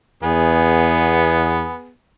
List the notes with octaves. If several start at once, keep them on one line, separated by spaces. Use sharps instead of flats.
E2 B3 G#4